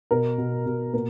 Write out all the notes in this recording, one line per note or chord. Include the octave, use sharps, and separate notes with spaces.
B2 A#4
B2
B2
A#2 A#4